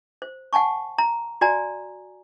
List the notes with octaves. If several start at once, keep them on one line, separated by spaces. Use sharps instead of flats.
C5
F#5 G#5 A5 C#6
A#5
F#4 D5 G#5 A#5